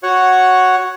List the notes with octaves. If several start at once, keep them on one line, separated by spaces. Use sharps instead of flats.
F#4 C#5 F#5